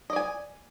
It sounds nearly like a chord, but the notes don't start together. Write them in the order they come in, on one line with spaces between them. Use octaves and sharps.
D#5 D5 G#5